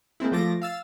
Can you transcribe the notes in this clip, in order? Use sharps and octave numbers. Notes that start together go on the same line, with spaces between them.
G#3 A#3 C4 E4
F3 A3 F4 D6 A6 A#6
F5 E6 A6